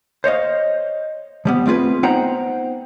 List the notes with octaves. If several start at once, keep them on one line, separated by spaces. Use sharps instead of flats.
C5 C#5 D#5 F5
F3 G3 B3
A3 C4 F4 G#4 B4
B3 D#4 C5 F#5 G5 A#5